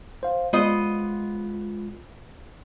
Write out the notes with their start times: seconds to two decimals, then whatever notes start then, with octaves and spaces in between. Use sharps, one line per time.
0.23 C5 F5
0.53 G#3 B3 F4 C5 D#5